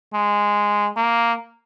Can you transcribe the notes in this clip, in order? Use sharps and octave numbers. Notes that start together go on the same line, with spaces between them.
G#3
A#3